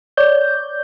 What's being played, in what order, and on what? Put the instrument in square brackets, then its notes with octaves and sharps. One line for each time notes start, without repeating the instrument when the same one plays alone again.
[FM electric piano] C#5 D5 G6